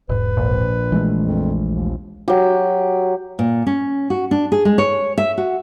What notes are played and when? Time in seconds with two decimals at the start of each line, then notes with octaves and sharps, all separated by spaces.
0.09 E1 G#2 B4
0.37 A#1
0.92 E3 G#3 A3
1.24 F2
1.69 D#2
2.28 F#3 G4
3.39 A#2
3.67 C#4
4.10 F#4
4.31 D4
4.52 G#4
4.65 G#3
4.78 C#5
5.18 E5
5.38 F#4